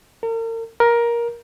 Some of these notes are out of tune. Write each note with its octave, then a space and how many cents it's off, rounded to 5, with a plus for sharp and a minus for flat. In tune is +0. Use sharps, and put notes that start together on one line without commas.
A#4 -40
A#4 +15